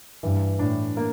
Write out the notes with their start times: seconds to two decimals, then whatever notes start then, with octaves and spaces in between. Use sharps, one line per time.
0.23 G2 E3
0.59 A2 D4
0.97 A#3